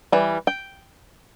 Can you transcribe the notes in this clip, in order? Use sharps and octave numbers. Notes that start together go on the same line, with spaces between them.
E3 G3
G5